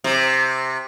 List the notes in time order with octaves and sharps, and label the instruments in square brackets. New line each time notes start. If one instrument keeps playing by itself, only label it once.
[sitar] C3